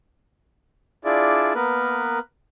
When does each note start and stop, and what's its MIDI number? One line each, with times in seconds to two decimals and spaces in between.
1.05 1.53 62
1.05 1.53 64
1.05 1.53 65
1.05 1.53 68
1.05 1.53 74
1.55 2.19 58
1.55 2.19 59
1.55 2.19 70
1.55 2.19 71